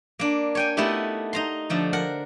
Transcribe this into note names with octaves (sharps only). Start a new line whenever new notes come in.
A#3 D4
C#5 G5 G#5
A3 B3 D#4 E4 F#4 G4
D#4 A#5 C6
D3 F3 A3
A#4 F#5